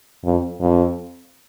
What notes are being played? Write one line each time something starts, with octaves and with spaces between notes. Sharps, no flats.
F2
F2